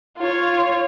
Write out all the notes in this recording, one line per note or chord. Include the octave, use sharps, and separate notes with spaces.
F4 C#5